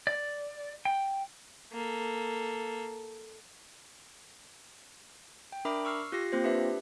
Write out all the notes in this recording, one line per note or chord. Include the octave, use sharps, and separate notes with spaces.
D5
G5
A#3 A4
G5
D4 A#4 E5 A#5 B5 D6
C#6 E6 F6 C7
F4 G4 A#6 C7
A#3 C4 F4 C5 A#6
D4 G4 B4 E5